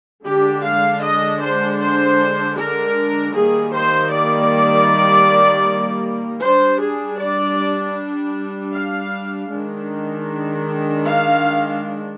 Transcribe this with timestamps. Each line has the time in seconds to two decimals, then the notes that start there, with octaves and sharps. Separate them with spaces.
0.25 D3 G#3 D4 G4
0.63 F5
1.02 D#5
1.41 C5
1.80 C5
2.57 A#4
3.34 D#3 G3 A#3 G#4
3.73 C5
4.11 D5
6.42 G3 D4 C5
6.81 G#4
7.20 D5
8.74 F5
9.51 D#3 G#3 D4
11.04 F5